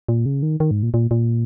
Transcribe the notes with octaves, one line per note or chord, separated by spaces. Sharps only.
A#2
C#3
D#3
D#3
G#2
A#2
A#2
A#2